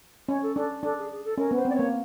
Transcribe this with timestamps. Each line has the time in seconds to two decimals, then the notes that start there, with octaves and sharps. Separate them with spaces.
0.29 C#4 C#5
0.42 A4
0.56 D4 A4
0.83 D4 A4
0.98 G#4
1.11 G#4
1.24 A4
1.38 C#4 A#4
1.51 B3
1.56 C5
1.65 C4
1.70 D5
1.75 A#3 C#5